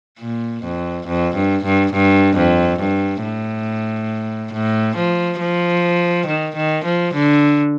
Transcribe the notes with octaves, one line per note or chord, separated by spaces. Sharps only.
A#2
F2
F2
G2
G2
G2
F2
G2
A2
A2
F3
F3
D#3
D#3
F3
D3